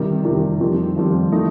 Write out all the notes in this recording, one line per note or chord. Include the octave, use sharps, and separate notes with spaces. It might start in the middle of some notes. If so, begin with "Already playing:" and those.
Already playing: C3 D#3 G3
C3 D#3 G3
F2 D#3 G3 C4
F2 D#3 G3 C4
D#3 A3 D#4